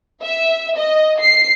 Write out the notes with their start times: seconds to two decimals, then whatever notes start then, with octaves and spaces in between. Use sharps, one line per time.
0.22 E5
0.76 D#5
1.20 C7